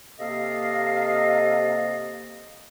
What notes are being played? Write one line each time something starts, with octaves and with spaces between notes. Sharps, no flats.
C3 A#3 A4 D#5 F5